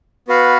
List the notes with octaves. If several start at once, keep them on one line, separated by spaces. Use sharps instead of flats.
B3 F#4 B4 F5